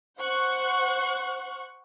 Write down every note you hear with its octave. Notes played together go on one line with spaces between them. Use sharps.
C5 F#5 C#6 F#6